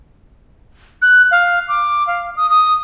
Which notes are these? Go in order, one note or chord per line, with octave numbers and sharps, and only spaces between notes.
F#6
F5
D6
F5
D#6
D#6